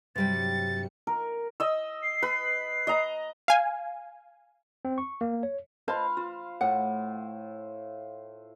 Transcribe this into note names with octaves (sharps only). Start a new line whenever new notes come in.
G2 C3 F#3 G3 G5 A6 C#7
A#4
D#5 E6
C7
B4
D#5 A#5
F5 G#5
C4
C#6
A#3
C#5
F4 B4 C5 D#5 F5 A5
F4 C5
A2 F#5